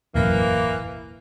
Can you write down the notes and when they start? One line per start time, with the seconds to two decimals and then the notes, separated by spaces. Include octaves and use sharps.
0.15 E1 A1 F#2 E3 A#3